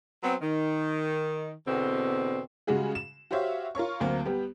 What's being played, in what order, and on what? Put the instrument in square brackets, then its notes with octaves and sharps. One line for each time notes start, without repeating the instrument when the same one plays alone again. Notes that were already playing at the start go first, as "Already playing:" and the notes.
[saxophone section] F#3 B3 C4
D#3
E2 B2 D3 C4
[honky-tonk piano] C#3 G3 G#3 F#4 G#4
E7
F#4 G4 C5 C#5 E5 F5
F4 A#4 C#5 C#6
D2 F#3 A#3 C4
G3 B3 G4